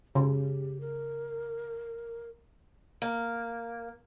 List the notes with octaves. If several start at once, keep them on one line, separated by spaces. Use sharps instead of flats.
C#3 G4
A#4
A#3